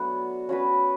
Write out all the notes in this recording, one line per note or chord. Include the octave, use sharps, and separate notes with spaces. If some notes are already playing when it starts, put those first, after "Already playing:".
Already playing: F#3 A3 B3 D4 F#4
C#4 F#4 B4